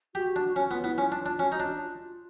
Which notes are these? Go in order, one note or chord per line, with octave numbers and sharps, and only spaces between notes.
F#4 G4
D4
C#4 F#4
B3 F4
B3 E4
C#4 F4
D4
D4
C#4 F#4
D#4 F#4
D4
F#4
F4